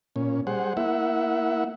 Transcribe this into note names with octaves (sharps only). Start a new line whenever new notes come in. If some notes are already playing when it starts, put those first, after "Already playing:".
A#2 C#4
G3 G#4 C5 F#5
A#3 E4 E5 F#5